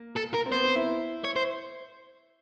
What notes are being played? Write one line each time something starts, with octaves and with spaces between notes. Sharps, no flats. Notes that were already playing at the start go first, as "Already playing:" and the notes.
Already playing: A#3
A4
A#4
C4
B3 C5
C4
E4
C#5
C5